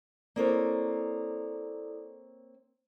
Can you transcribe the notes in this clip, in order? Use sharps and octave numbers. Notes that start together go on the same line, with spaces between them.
A#3 C4 E4 A4 C#5 D5